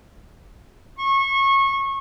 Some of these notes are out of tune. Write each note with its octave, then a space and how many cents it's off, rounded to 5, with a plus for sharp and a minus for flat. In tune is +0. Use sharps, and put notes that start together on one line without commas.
C#6 -25